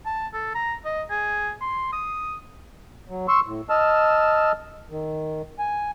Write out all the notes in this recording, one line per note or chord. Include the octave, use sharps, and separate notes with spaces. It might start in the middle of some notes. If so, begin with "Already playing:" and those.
A5
A4
A#5
D#5
G#4
C6
D#6
F#3
C6 C#6 E6
A2
D#5 A5 E6 F6
D#3
G#5